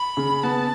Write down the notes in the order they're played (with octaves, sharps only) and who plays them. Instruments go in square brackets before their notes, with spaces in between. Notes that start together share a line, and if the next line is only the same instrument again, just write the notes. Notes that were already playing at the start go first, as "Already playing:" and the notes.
Already playing: [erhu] B5
[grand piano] C#3
[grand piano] B3 [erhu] A5